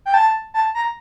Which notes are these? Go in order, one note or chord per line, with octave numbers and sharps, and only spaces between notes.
G5
A5
A5
A#5